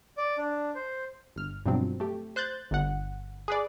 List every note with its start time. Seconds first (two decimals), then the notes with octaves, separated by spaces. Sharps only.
0.17 D5
0.37 D4
0.75 C5
1.36 G1 F6
1.66 G2 B2 F3 F#3 C4
2.00 A3 G4
2.36 C5 F#6 G6 A6
2.71 G1 F#5
3.48 G#4 B4 D5